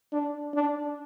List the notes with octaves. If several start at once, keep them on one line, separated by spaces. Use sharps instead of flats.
D4
D4